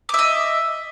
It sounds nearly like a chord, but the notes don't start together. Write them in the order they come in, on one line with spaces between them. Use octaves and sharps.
D6 E5 D#5